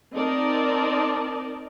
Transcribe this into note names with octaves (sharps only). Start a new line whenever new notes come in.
C4 D#4 A#4 D5 D#5 A5